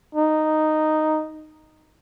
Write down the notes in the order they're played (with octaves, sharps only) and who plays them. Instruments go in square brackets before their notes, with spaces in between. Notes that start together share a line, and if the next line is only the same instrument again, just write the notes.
[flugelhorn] D#4